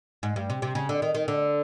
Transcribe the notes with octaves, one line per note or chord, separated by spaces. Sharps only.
G#2
G2
C3
C3
C#3
D3
D#3
D#3
D3